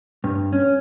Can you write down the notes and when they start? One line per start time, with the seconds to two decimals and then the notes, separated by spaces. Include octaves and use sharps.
0.24 G2
0.53 C#4